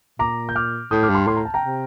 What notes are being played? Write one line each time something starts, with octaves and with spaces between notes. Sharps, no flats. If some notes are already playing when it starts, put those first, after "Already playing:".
A#2 A#5 D6
G6
D6 F6
A2 D#6 G6
D6 F6
G2
A5 C6
A2 C6
A#5
A5
G5 A#5
C3